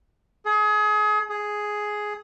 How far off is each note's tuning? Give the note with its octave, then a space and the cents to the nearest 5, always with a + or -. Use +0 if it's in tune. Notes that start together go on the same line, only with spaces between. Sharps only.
G#4 +30
G#4 +5